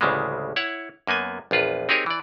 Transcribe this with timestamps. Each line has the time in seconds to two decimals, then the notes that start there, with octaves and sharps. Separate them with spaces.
0.01 A1 D2 C#3 G3 G#3
0.56 E4 C#5 F#5
1.07 F#2 A#3 B3 G#5
1.51 A#1 E2 F4 B4
1.89 C4 D#4 G4 G#4 A#4 C#5
2.06 E3 D5